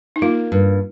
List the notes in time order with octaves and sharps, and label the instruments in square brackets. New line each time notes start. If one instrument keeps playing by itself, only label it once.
[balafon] D#4
[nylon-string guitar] A#3 [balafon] F4
[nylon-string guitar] G2